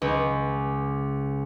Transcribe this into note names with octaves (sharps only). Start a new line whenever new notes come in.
C#2